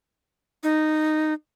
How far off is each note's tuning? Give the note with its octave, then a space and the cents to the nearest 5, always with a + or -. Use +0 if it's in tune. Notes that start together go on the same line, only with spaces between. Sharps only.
D#4 -10